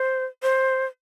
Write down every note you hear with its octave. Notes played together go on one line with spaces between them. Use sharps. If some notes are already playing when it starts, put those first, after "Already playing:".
Already playing: C5
C5